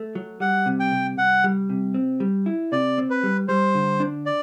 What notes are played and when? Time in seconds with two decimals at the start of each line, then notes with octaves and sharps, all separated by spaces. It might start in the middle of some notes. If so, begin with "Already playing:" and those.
Already playing: A3
0.15 F#3
0.40 G3 F#5
0.66 C3
0.80 G5
0.92 C2
1.18 C2 F#5
1.44 G3
1.69 C3
1.94 C4
2.20 G3
2.46 E4
2.72 C3 D5
2.98 C4
3.10 B4
3.23 G3
3.48 G3 C5
3.75 D3
4.00 D4
4.26 D5